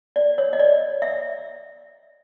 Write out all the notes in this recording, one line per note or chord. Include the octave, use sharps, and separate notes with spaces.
D5
C#5
D#5
D5
E5